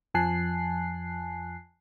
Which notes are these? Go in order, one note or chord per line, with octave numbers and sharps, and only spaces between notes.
F2 F3 G#5 A5 F#6 C7